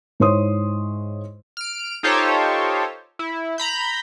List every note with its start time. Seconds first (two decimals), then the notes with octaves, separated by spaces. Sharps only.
0.20 G#2 E4 C5 C#5 C6 D#6
1.57 F6 D7
2.03 D#4 F4 G4 A4 C5 C#5
3.19 E4
3.58 A#5 B5 G6